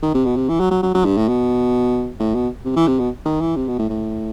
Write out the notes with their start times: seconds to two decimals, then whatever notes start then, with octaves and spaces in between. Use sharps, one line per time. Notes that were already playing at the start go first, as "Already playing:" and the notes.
0.02 D#3
0.14 C3
0.25 B2
0.36 C3
0.48 E3
0.60 F#3
0.71 F#3
0.82 F#3
0.94 F#3
1.05 G2
1.17 A2
1.28 B2
2.19 A2
2.34 B2
2.65 C3
2.76 E3
2.87 C3
2.99 B2
3.25 D#3
3.41 E3
3.56 C3
3.68 B2
3.78 A2
3.89 A2